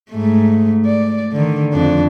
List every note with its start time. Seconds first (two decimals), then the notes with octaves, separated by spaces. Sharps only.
0.11 G#2 A3
0.86 D5
1.32 D3 D#3
1.73 F2 D4